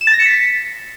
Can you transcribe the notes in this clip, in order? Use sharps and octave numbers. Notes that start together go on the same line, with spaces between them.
E7
A6
A#6
C#7
B6